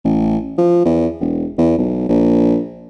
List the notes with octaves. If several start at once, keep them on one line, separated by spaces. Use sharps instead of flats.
A1
F3
E2
E1
E2
B1
A#1